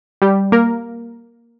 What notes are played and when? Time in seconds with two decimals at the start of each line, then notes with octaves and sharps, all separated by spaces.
0.22 G3 G4
0.52 A#3 A#4